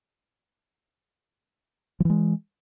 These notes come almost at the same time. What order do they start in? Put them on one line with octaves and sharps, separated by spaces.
F3 E3 G#3